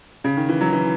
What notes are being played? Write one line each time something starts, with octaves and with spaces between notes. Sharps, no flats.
C#3
D#3
E3
F#3
E3